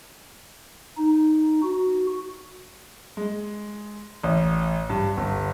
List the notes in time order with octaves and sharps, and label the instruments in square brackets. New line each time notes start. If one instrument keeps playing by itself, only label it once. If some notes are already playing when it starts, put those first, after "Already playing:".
[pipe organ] D#4
F#4
[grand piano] G#3
A1
G2
G1